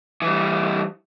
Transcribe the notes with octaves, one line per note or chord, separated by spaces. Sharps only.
E3 G3